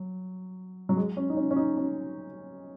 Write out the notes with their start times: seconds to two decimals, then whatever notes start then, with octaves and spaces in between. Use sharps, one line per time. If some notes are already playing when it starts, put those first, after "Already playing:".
Already playing: F#3
0.89 F#3
0.97 G#3
1.17 C#4
1.30 D#4
1.37 C#4
1.51 C#4
1.56 D#4
1.77 C#4